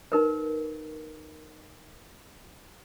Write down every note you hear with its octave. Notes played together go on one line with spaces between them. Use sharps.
D#4 A#4 B4